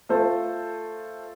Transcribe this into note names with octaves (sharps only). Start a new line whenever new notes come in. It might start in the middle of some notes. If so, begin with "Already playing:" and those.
A3 F4 A4 C5